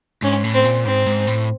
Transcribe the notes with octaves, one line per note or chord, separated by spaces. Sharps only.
G#2 C#4
A2
C4
A#2
G#2 C4
G#2
A2